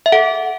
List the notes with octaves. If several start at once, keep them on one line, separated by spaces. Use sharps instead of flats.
E5
A4 F#5